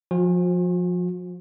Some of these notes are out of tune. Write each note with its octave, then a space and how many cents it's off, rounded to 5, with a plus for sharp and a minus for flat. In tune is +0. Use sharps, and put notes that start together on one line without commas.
F3 +20 F#4 -45 G#5 -30